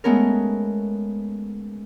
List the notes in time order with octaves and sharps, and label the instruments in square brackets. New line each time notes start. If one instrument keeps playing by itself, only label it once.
[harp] G#3 A3 B3 C#4 A#4